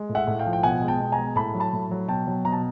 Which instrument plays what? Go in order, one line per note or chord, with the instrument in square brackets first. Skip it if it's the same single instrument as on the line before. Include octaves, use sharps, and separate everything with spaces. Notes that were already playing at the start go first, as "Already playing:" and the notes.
Already playing: [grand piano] G#3
A2
E5 F#5
A2
F5 G5
F3
G5
B2 F#5 G#5
G#3
G5 A5
B2
G#5 A#5
G#3
A2 A5 B5
F#3
A5 B5
A2
F#3
B2 G5 A5
F#3
B2 A#5
A5